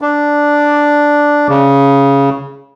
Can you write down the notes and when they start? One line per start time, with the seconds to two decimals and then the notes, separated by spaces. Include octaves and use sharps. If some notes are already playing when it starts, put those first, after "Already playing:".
0.01 D4
1.49 C#3